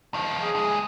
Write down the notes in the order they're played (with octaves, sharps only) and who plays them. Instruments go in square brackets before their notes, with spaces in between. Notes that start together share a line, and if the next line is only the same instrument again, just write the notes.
[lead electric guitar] D#3 F3
[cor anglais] G#4
[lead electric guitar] D#2 G#3